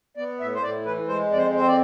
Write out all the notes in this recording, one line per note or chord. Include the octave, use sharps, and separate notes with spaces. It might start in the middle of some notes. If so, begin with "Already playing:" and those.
B3 D5
A2 E5
C5
A2 D5
E3 B4
G#3 C5
F2 D5
C5
C4 C5
D5